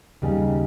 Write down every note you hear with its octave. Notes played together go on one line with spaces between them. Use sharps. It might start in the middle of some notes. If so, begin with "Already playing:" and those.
D#2 C#3 G3